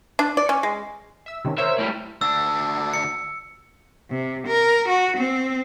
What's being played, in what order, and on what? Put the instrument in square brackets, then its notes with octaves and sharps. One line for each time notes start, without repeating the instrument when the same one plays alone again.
[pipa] D4
D5
C#4
G#3
[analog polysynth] E5 E6
C3 D#3 C#4
[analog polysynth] A#4 C5 C#5 [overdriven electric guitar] E5
[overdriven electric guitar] A2 G3
[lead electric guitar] D2 D4 [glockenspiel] E6
[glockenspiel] C#7
[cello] C3
A#4
F#4
C4